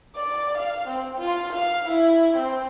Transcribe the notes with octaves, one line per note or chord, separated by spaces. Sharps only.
D5
F5
C4
F4
F5
E4
C4